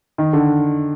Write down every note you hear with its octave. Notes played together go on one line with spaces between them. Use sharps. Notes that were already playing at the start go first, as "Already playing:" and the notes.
D#3
D3